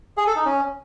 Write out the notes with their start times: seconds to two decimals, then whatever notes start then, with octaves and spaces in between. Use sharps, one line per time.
0.17 G#4
0.27 A4
0.36 D#4
0.45 C#4